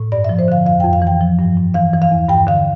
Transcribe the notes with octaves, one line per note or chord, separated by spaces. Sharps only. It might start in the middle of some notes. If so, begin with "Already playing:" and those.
Already playing: A2
G2 D5
F3 E5
C5
D3 F5
F2 F5
F2 G5
F5
E3
G5
F3
G2
G2
E3 F5
E3
F5
E2
G2 G5
D3 F5